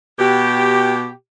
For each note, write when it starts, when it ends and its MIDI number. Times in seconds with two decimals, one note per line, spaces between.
0.19 1.11 47
0.19 1.11 67